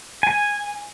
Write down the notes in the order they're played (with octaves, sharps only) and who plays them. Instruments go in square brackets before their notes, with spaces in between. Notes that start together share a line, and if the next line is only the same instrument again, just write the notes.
[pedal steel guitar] G#5